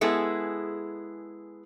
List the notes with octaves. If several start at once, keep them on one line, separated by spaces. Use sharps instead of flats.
G#3 B3 E4 G#4 A4